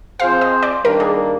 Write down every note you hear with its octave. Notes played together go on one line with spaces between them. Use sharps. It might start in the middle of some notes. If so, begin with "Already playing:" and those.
F3 C4 F4 G#4 C5 F5
D#5
D5
D#3 G3 A#3 D4 A#4
G#4